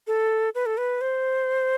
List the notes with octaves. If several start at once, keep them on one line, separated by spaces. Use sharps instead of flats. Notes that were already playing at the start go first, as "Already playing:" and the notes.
A4
B4
A4
B4
C5